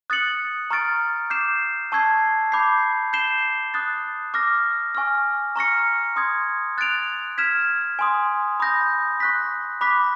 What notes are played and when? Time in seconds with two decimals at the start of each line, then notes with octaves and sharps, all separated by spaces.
0.10 D#6 F#6 A6 C#7 F#7
0.71 A#5 C#6 F6 A6 D7
1.30 D6 G6 C7 E7
1.92 A5 C#6 E6 G#6 C7
2.52 B5 D6 G6 C7
3.13 G6 C7 E7 G7
3.74 D#6 F#6 A6
4.34 D6 F6 A#6
4.95 G#5 C#6 F6
5.56 A#5 C#6 F6 A#6 C#7
6.16 C6 D#6 G#6
6.78 F#6 A6 D7 F7
7.38 F6 G#6 B6 E7
7.99 G#5 C6 D#6
8.60 B5 D#6 G6 A#6
9.20 C#6 F#6 B6
9.81 B5 D6 F#6 B6